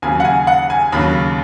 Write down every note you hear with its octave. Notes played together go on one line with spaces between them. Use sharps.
D#2 C#3 F#3 G#5
F#5
G#5
F#5
G#5
D#2 C#3 F#3 B5